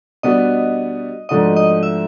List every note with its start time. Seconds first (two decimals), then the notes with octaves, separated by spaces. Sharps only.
0.23 B2 G3 B3 D4 F#4 D#5
1.29 G#2 F3 A3 D4 F#4 D#5
1.56 D#5
1.83 E5